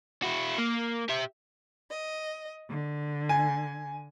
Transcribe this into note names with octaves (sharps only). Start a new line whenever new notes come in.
E4 F#4
A#3
G4 E5
D#5
D3
G#5